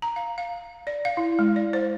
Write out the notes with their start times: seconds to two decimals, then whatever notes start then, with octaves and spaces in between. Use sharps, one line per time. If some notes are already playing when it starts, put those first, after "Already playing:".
0.02 A#5
0.16 F5
0.38 F5
0.87 D5
1.05 F5
1.17 E4
1.39 G#3
1.56 D5
1.73 C5